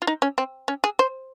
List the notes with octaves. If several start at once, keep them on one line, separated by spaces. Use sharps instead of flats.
F4
D#4
C#4
C4
C#4
G#4
C5